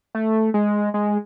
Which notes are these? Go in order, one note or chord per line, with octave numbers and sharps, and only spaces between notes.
A3
G#3
G#3